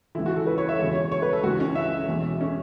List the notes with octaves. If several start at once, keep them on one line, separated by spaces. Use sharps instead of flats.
C#2 C#3 E3 E4
F#4
A4
B4
C#5
E5
E1 E2 C#3 C#5
C#5
C#5
B4
A4
C#2 C#3 E3 F#4
C#4
E5
E1 E2 B2
C#4